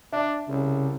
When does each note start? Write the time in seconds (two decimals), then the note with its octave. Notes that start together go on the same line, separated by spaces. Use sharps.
0.13 D4 E5
0.48 C2 C#3